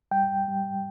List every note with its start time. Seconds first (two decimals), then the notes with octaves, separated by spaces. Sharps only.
0.11 G3 G5
0.48 G3